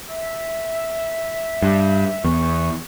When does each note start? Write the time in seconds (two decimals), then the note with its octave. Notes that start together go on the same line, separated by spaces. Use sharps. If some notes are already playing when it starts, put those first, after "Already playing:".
0.09 E5
1.62 G2
2.24 E2 C#6